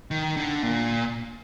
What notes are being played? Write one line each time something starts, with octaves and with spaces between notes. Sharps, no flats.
D#3
D3
A#2